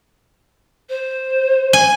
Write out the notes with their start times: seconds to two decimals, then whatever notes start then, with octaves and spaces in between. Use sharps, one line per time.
0.89 C5
1.73 G#5